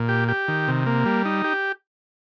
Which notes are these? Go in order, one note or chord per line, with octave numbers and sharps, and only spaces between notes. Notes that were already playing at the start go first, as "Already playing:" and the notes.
Already playing: A#2
G4
G4
D#3
C3
A#3
G3
D#4
G4